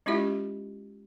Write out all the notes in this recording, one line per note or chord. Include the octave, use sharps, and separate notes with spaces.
G#3 C#4 E4 F4 G4 E5